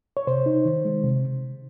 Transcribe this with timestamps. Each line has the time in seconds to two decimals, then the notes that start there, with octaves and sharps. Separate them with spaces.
0.17 C#5
0.27 C3 C5
0.46 D#4
0.65 D#3
0.85 G#3
1.04 C3